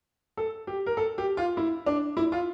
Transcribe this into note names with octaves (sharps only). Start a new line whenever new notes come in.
A4
G4
A#4
A4
G4
F4
E4
D4
E4
F4